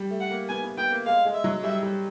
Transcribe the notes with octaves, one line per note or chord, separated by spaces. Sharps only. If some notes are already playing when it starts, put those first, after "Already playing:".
Already playing: G3
A3
F#5
A#3
B3 G#5
B3
B3 G5
A#3
G#3 F5
G#3
E5
F#3
G3 E5
G3